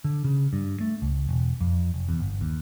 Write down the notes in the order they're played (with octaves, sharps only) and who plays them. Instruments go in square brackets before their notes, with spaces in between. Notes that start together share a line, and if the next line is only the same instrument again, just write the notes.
[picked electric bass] D3
C#3
G2
A3
C#2
E1
F2
F1
E2
G1
D#2